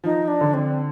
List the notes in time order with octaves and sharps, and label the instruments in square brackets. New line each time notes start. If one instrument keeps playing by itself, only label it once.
[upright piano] F3 [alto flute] D#4
[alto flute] D4
[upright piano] D3
[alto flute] C4